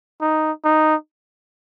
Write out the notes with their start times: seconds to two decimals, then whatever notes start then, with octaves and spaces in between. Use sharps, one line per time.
0.21 D#4
0.65 D#4